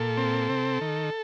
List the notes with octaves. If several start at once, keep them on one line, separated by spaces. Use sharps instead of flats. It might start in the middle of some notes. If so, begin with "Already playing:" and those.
Already playing: A#2 A4
C4
C3
D#3